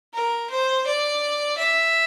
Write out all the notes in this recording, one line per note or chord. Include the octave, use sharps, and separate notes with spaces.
A#4
C5
D5
E5